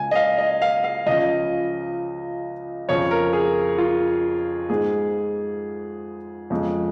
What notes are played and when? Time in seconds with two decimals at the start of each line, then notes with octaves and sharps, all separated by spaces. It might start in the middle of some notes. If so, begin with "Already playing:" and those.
Already playing: C#2 C#3 G#3 G#5
0.11 D#5
0.15 F5
0.38 D#5
0.62 F5
0.84 F5
1.06 C#2 C#3 F3 D#5
2.88 F2 C#3 F3 C#5
3.11 A#4
3.33 G#4
3.78 F4
4.70 G#2 G#3 G#4
6.50 F2 C#3 G#3